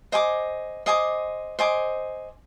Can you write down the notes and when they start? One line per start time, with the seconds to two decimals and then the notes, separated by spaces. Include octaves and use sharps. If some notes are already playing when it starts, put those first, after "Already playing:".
0.12 C5 D#5 G#5 D6
0.86 C5 D#5 G#5 D6
1.59 C5 D#5 G#5 D6